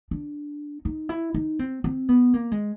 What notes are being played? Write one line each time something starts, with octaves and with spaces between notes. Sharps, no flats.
D4
D#4
E4
D#4
C4
C4
B3
A#3
G#3